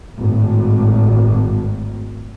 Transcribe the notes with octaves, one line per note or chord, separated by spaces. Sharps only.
G#1 A2